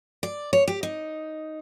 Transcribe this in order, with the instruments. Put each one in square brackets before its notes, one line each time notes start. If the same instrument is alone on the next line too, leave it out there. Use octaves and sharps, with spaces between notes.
[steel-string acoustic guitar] D5
C#5
G4
D#4